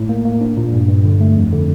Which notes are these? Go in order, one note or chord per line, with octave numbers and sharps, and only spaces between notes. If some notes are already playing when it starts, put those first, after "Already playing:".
Already playing: A2
A#3
A#3
D4
A#2
G2
G2
D3
A3
F2
D3